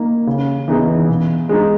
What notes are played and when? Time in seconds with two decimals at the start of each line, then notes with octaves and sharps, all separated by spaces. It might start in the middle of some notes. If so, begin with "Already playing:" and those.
Already playing: A#3 D#4
0.27 C#3
0.68 E3 B3 D#4 G#4
1.09 B2
1.49 G#3 D#4